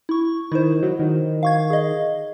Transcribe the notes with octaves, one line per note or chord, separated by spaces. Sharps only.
E4 C#6
D#3 E4 C5
F#3
D#3
F5 C#6 G#6
G#4 D#5